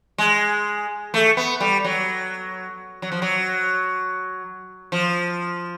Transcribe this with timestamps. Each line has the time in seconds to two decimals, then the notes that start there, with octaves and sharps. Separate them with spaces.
0.18 G#3
1.14 A3
1.37 B3
1.60 G3
1.84 F#3
3.02 F#3
3.12 F3
3.22 F#3
4.92 F3